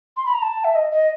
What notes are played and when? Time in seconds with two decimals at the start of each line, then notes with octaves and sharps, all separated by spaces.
0.17 C6
0.26 B5
0.34 A#5
0.42 A5
0.65 E5
0.75 D#5
0.92 D#5